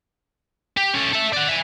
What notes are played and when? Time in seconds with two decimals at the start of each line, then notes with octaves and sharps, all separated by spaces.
0.77 G4
0.94 C#4 A4
1.12 A4 E5
1.33 D5 F#5
1.48 E5 G#5